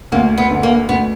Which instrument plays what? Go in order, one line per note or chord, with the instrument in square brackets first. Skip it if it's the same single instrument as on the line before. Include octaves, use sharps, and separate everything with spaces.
[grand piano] D2 [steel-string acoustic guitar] A#3
[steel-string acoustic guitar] B3
[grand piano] D3
[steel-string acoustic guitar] A#3
[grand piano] D2 [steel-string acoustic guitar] B3